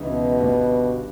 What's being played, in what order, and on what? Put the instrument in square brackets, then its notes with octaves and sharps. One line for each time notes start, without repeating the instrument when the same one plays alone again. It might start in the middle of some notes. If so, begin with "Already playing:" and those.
Already playing: [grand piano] C#2 C#3 E3 G#3 D#4
[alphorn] B2
[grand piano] G1 G2 G3